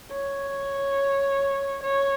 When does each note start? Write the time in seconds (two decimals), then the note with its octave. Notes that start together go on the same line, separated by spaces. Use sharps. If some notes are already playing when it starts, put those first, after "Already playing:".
0.12 C#5
1.83 C#5